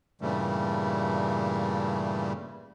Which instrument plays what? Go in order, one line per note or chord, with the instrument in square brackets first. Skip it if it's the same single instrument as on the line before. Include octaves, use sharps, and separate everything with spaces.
[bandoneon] G2 A#2 C#3 E3 G3 A3